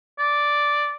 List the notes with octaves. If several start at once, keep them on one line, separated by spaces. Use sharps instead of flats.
D5